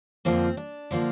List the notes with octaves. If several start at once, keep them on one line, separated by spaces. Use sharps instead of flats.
F2 D3 F3 A#3 C4
D4
D3 F3 A#3